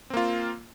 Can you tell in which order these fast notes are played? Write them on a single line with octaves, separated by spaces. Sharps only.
C4 A#3 F4